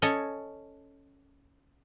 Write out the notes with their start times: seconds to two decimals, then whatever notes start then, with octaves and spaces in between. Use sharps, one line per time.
0.02 C#4 A4 C#5 D#5 G#5